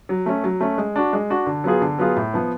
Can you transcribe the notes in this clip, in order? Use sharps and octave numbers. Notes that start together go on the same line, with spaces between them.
F#3
A3 C#4
F#3
A3 C#4
G#3
D4 F#4
G#3
D4 F#4
D3
F#3 B3 F4 G#4
D3
F#3 B3 F4 G#4
A2
F3 B3